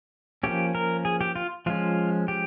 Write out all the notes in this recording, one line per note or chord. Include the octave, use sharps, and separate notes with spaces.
F3 A#3 C#4 G4
A#4
G#4
G4
F4
F3 G#3 C#4 F4
G4